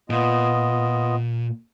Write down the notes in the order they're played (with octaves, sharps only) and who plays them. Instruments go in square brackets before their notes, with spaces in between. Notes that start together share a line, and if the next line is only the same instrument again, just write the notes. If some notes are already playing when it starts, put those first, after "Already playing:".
[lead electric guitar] A#2 [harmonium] B3 F4 D#5